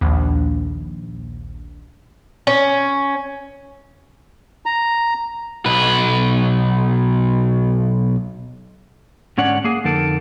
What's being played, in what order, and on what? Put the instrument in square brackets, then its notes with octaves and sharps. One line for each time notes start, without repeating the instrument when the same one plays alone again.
[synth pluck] A#1 D#2
[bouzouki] C#4
[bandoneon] A#5
[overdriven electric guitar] B1 B4
[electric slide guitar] G#2 D3 C#4 C#5 D5 F#5
A#3 G#4
F2 D3 D#4 A4 A#4